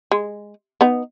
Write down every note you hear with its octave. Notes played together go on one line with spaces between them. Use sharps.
G#3
B3 D#4